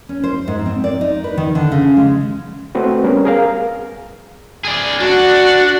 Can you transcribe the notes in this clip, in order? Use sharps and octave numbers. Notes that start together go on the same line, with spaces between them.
C#4
C5
G#2
C4
D5
D#4
B4
D#3
D3
C#3
G#3
A3 C4 F#4 B4
G3 B3 C#4 A#4
G#4 A#4 F5
G#4 D5
D4 F#4 F#5